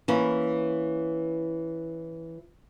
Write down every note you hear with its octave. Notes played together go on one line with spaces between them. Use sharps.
E3 A#3 C#4 E4